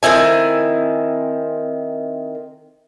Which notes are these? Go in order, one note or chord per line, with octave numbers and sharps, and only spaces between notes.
D#3 C4 E4 G#5